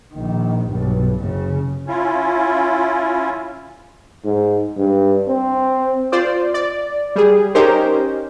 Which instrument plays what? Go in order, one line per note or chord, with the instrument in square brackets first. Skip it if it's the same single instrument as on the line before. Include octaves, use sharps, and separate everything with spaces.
[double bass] A#1 D#3
B1 G2
F#1 C#3
[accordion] C#4 E4 F4
[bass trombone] G#2
G2
C4
[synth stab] F4 C5 D5
D5
G3 G#4
C#4 D#4 G4 A#4 C5